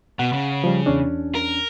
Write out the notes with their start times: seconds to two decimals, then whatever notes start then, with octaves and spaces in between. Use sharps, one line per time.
0.19 B2 F#5
0.33 C#3
0.64 F3 G3
0.86 E2 C#4 D4
1.35 A#4